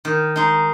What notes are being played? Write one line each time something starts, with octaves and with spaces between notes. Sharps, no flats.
D#3
G#3 D#4